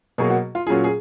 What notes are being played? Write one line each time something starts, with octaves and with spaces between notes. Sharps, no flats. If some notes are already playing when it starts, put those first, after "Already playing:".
B2 F#3 A#3 G#4
F#4
F4
A#2 F#3 C#4 F4 G#4
G#4